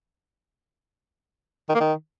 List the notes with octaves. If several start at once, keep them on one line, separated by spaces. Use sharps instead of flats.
D#3
A#3
D#3